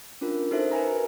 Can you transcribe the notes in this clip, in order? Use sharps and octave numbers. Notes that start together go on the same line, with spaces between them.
C#4 D4 F4 A#4
D#4 F#4 A4 C5 E5
A#4 B4 G#5 A#5